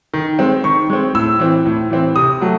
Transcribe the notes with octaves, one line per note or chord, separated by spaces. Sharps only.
D#3
G#3 C4
D#3 C#6
G#3 C4
A2 E6
E3 C4
A2
E3 C4
C3 D#6
F#3 A3